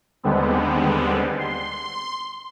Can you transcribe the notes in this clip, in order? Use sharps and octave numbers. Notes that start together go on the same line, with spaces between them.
D#2 D3 G3 G#3 B3 C4
C6